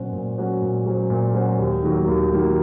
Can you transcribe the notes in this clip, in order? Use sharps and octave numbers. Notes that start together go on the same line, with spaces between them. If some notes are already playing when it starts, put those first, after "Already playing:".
Already playing: A#2 F#3 C#4 F#4 C5
A#2
F#3 C#4 F#4 C5
A#2
F#3 C#4 F#4 C5
A#2
F#3 C#4 F#4 C5
D#2
D#3 F#3 A#3
D#2
D#3 F#3 A#3